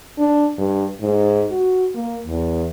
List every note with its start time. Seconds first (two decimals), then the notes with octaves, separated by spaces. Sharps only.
0.18 D4
0.58 G2
1.01 G#2
1.51 F#4
1.95 A#3
2.27 E2